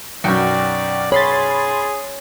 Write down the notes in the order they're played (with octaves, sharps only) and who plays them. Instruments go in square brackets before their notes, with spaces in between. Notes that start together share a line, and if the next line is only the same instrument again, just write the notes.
[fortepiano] B1 F#2 [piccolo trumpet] D5 [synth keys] G5 C#6
[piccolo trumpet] G#4 [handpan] C#5 [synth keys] B5 C6 A6